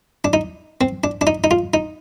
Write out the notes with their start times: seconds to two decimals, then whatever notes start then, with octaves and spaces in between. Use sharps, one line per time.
0.25 D4
0.33 D#4
0.81 C4
1.04 D4
1.21 D4
1.27 D#4
1.44 D#4
1.51 F4
1.74 D#4